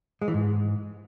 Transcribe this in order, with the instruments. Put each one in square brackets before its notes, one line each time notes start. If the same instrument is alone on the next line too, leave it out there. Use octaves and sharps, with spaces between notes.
[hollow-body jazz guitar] G#3
E3
G#2